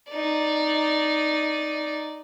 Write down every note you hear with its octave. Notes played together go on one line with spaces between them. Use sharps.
D#4 D5